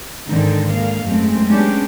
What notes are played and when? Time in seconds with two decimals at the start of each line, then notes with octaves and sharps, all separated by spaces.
0.27 G#2 D3 D#3 G#3 C4 D#4
0.72 D3 G#3 A#3 F5
1.03 F#2 G#3 A3 C4
1.48 G#3 B3 C#4 D4 G4